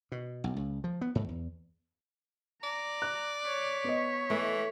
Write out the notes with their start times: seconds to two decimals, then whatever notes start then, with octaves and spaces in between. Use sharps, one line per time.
0.12 B2
0.44 B1
0.56 C#2
0.84 F3
1.01 B3
1.15 G#2
1.29 E2
2.63 D5 A#5
3.02 F#6
3.46 C#5 B6
3.84 B3 D#5
4.30 E3 A3